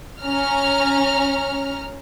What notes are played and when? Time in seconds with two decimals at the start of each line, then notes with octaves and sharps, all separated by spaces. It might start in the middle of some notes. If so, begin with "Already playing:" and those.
0.22 C#4 A#5 F6